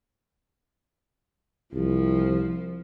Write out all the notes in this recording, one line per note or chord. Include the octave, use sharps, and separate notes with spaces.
C2 F3